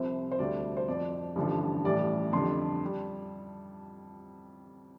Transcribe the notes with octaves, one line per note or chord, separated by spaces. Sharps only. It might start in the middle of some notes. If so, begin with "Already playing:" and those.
Already playing: C2 C3 F3 C5
C5
D2 D3 G3 D5
C5
F2 F3 D5
A1 G2 D3 F3
A1 A2 G3 D5
F2 D3 G3 C6
G3